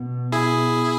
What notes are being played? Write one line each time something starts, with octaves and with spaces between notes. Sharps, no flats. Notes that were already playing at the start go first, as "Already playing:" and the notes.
Already playing: B2
E4 G#4